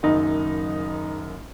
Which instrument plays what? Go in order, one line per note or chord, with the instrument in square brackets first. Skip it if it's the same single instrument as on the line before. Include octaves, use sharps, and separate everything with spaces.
[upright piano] F#1 F#2 D#3 D#4